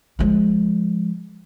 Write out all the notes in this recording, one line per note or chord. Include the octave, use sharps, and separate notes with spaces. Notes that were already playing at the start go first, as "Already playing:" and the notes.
F3 G#3